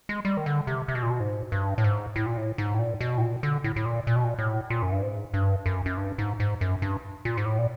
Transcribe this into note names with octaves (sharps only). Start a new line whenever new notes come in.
G#3
G3
D#3
D3
C3
C3
B2
A#2
B2
G#2
G2
A2
G#2
A2
A#2
A2
G#2
A2
A#2
B2
A2
A#2
D3
A2
A2
A#2
A#2
B2
A#2
A2
A#2
F#2
G2
G#2
G2
F#2
F#2
G2
G#2
G#2
F#2
G2
A#2
G#2
A2
A#2